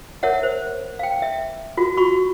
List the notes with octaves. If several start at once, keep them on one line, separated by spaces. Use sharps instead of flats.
A#4 C#5 E5 F#5
C5
F5 G5
E5
F4 F#4
F#4 B5 C#6